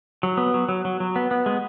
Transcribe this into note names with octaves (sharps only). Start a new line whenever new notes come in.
F#3
B3
F#3
F#3
F#3
F#3
B3
B3
G#3